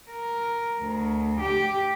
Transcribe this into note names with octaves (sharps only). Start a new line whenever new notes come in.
A#4
D2
G4